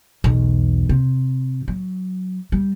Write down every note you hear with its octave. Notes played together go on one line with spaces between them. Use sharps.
B1 E2
C3
F#3
G3